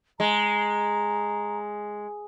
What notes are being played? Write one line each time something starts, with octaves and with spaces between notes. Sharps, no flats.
G#3 A#5